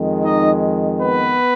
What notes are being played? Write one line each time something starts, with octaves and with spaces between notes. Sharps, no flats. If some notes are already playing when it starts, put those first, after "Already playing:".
Already playing: F2 D#3 G#3
D#4 D#5
B3 B4